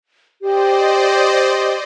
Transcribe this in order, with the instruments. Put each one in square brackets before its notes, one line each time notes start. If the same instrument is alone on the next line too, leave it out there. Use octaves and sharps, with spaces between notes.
[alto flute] G4 [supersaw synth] C5 D5 D#5